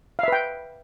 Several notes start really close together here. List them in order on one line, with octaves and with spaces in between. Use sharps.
F5 E5 B4 G5